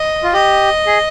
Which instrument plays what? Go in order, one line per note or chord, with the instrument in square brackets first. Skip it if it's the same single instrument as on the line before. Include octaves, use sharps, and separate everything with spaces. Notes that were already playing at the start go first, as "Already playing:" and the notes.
Already playing: [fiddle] D#5
[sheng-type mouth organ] F4
[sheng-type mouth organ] G4 [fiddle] D#5
[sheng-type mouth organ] G#4